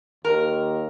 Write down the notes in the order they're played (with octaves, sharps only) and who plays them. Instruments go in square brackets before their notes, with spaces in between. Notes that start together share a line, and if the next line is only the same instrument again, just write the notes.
[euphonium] D#2 [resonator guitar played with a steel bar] A#4